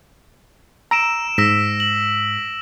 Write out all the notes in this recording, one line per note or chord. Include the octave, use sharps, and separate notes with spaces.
A#5 E6 D7 E7
G#2 E6 A#6 B6
F#7